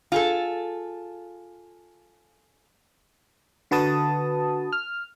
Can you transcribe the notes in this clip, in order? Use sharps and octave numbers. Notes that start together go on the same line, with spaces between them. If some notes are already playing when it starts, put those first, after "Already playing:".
F4 G#4 A4
D3 F#4 B4 A5 D#6
F6